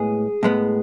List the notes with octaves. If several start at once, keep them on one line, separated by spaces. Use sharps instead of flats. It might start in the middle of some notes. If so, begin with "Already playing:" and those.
Already playing: A2 G#3 B3 G#4
A2 G#3 B3